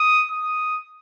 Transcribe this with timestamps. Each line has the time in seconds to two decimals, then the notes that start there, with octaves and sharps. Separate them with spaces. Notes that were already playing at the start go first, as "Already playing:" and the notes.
Already playing: D#6
0.31 D#6